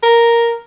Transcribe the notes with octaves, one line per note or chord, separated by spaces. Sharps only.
A#4